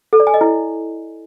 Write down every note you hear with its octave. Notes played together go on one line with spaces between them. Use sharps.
A4
D5
G#5
D#5
E4